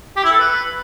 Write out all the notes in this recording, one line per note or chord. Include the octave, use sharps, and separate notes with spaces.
G4
E4
A4
B4